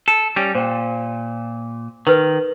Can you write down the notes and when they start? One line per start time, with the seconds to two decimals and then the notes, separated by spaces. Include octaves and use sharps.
0.08 A4
0.36 G3 C#4
0.55 A#2 C5 G5
2.07 D#3 A#4 B4